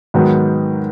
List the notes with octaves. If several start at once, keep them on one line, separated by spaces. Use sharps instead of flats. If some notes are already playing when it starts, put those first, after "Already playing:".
G#2 D#3 F#3 B3